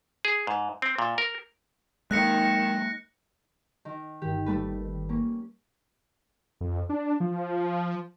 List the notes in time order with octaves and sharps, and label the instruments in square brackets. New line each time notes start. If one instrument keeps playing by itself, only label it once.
[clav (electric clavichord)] G#4
G#2
C4
A#2
A#4
[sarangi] D#3 [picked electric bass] G#3 A#3 [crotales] F#6 A#6 C#7
[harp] D#3
[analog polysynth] G1 D#3 [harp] G4
[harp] G3 A3 B4
A#3 C#4
[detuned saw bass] F2
D4
F3